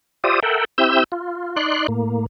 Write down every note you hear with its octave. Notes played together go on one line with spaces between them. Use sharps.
F4 G4 C5 D5 E5 D#6
A4 A#4 E5 F#5 G5
C4 E4 G4 E5 E6 G6
F4
D#4 D5 C6 F#6
A2 A#3